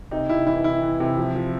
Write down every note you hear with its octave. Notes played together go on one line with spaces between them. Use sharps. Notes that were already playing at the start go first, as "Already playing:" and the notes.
C3 D#4
C3 E4
E3 E4
C3 E4
E3
C3
F3
F3